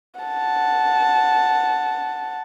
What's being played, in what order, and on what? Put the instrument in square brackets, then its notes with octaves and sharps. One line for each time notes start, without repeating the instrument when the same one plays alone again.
[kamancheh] F#5 A5